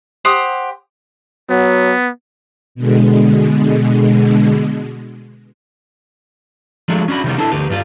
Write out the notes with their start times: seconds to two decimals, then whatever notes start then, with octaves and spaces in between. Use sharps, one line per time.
0.25 G4 C5 F#5 D#6
1.50 F#3 B3
2.75 B2 D3 G#3
6.88 F3 F#3 G#3 A3 D4
7.08 C#4 D4 F#4 B5
7.24 C3 D#3 G3 B3
7.38 D4 E4 A4 A5
7.52 D2 G4 B4
7.70 G2 G3 F4